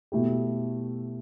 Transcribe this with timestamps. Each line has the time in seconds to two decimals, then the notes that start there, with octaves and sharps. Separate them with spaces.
0.12 B2 A3 E4 G4